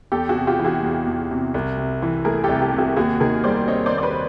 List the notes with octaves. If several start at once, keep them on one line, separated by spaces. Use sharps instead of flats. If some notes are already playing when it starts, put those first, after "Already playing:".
E2 G4 A4
F#4 G#4
C3
F4 G4
E3
F#4 G#4
E2
E2
C3
C2
C3
E3
A3 G#4 A#4
C2 G4 A4
G4 A4
C3
F#4 G#4
D#2 F#4 G#4
D#3 G#4 A#4
G3 C5 D5
C4 C#5 D#5
C5 D5
D#2
D5
B4 C#5